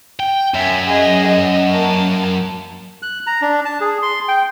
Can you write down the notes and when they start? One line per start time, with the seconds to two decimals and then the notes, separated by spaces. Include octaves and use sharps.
0.20 G5
0.54 F#2 E5 G#5
0.86 G#4 D#5
1.27 D#5
1.71 A#3 A5
3.02 F#6
3.27 A#5
3.42 D4
3.65 A5
3.81 G#4
4.02 C6
4.28 G5